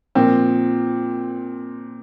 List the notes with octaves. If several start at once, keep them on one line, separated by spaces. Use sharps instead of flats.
A#2 F3 C4